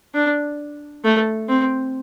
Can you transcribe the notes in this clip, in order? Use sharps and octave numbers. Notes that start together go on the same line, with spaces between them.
D4
A3
C4